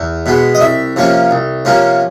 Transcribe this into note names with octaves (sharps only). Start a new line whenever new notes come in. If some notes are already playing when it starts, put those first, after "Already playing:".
Already playing: E2
B2 G#3 B3
D#5
C2 E5
C3 F3 A#3 C#4
C2
C3 F3 A#3 C#4